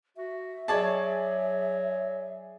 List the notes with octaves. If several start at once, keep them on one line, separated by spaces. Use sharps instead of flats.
F#4 E5
F#3 G#4 C#5 D5 A5 G#6